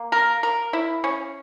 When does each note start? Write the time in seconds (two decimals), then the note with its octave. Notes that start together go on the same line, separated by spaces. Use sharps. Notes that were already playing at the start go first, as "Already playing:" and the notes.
Already playing: A#3
0.12 A#4
0.43 A#4
0.73 E4
1.04 C#4